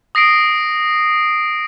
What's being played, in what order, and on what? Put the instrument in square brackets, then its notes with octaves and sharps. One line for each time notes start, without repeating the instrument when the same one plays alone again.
[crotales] D#6 A#6 C7 D7